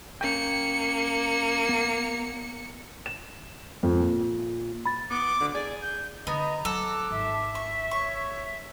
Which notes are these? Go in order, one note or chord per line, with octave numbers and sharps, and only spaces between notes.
A#3 C#4 G5 C#7
B3
E7
F2
A#2
B5 A6
B3 D6
D3
G#4 D5
G6
D3 B3 D#5 A#5
F#3 A4 F#5 D6
G#1 E5
C#6
C#5 C#6